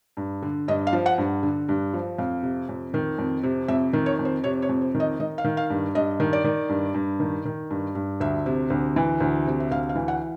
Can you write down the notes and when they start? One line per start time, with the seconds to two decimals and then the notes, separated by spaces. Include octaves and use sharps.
0.17 G2
0.42 D3
0.68 G2 D#5
0.87 F5
0.93 F3
1.06 F#5
1.18 G2
1.43 D3
1.69 G2
1.94 F3
2.18 F2 F5
2.43 C3
2.69 F2
2.94 D#3
3.18 F2
3.43 C3
3.68 F2 E5
3.93 D#3
4.06 C#5
4.19 F2
4.25 C5
4.44 C3 C#5
4.62 C#5
4.69 F2
4.82 C5
4.95 D#3
5.00 D#5
5.20 D#3 D#5
5.38 F5
5.45 D#3
5.57 F5
5.70 G2
5.95 G2 D#5
6.20 D#3
6.33 D5
6.44 D#3
6.69 G2
6.94 G2
7.20 D#3
7.45 D#3
7.70 G2
7.95 G2
8.20 D2 E5
8.46 C3
8.70 D2
8.96 E3
9.20 D2
9.46 C3
9.60 E5
9.71 D2 F5
9.89 F5
9.95 E3
10.08 F#5